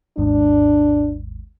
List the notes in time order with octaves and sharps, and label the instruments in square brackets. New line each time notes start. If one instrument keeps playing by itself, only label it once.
[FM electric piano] G#1 D#2 G#2 [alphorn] D4